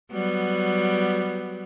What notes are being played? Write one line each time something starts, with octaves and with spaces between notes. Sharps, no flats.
F#3 G3 B3